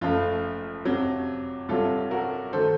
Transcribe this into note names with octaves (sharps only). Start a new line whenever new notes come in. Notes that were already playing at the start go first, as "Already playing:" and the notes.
F#1 F#2 F3 A3 F4
F2 C3 F#3
C2 C3 F#3 F4 A4
F#4 A#4
D#3 A3 A4 C5